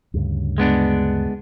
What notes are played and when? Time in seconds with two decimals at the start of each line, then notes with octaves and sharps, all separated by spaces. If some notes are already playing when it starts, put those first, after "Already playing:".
0.14 D2 G2 C#3
0.58 G#3 B3 D4